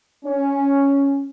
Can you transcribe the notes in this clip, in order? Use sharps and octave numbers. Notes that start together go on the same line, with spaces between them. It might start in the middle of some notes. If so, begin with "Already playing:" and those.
C#4